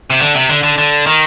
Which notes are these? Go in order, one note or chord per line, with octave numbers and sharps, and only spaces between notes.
C3
D3
C3
D3
D3
D3
D#3